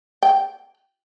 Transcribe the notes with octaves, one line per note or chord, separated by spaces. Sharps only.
G5